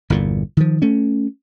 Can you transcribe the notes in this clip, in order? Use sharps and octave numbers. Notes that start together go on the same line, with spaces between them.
G1 E2 A#2
D#3 F3
A3 C#4